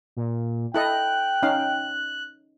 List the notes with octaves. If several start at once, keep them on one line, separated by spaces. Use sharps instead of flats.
A#2
E4 A4 D#5 G5 F#6
C#4 D#4 F5